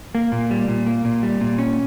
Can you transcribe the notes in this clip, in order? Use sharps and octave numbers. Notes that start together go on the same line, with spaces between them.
A#3
A#2
G3
A#2
A#3
A#2
G3
A#2
C#4